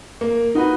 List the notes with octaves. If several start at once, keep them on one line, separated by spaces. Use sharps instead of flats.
A#3
D#4 F#4 B4